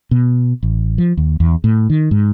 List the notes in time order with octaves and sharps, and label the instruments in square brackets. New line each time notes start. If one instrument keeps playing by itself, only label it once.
[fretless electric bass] B2
A1
F3
D#2
E2
A2
D#3
G#2